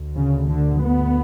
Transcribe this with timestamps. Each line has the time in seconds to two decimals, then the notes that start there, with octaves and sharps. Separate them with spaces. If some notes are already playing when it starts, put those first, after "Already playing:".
Already playing: D2
0.15 C#3
0.49 D3
0.82 B3